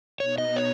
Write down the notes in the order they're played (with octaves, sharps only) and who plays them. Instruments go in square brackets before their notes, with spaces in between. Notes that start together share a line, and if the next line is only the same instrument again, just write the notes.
[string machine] B2 B3 D#4 [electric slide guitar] C#5
[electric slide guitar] D#5
C#5